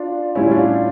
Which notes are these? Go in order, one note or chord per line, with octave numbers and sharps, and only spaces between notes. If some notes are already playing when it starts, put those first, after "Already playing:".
Already playing: D4 F4
A2 G3 C#4 E4
D4 F4